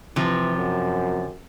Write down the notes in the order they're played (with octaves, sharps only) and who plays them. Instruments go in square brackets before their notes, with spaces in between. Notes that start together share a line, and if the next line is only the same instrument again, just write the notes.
[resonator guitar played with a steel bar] C3 F3 [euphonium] E3
[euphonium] F#2